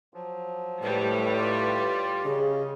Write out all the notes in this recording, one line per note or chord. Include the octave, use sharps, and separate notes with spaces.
F3 F#3
A2 G3 B4
F4 D5
C#3 G#4 D#5